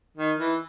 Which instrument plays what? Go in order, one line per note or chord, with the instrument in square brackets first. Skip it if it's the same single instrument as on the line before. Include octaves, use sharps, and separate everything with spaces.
[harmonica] D#3
E3